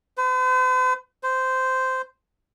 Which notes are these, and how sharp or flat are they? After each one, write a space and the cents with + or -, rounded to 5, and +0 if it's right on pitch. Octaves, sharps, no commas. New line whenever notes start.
C5 -45
C5 -10